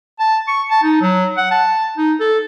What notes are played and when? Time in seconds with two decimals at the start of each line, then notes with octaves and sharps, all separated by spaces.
0.20 A5
0.48 C#6
0.70 A5
0.83 D#4
1.01 F#3
1.37 F#5
1.51 A5
1.97 D#4
2.20 A4